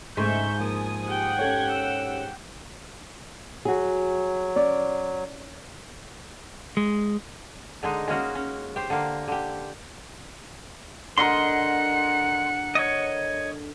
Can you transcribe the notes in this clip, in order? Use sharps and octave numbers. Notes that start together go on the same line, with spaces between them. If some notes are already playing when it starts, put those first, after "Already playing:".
G#2 C#3 A3 G#4 E5 C#6 G6
F3 A#3 G#5 D#6
G4 F#5 G5
C#4 A4 C#5 G#6
E6
F#3 F#4 G#4
C#4 D5
G#3
D3 G#3 D#4
G#3 A#3 C#4 F#4
C#4
G4 C5
D3 A#3
D3 G4
D3 A#4 D#5 F#5 C6 C#7
C#5 D#5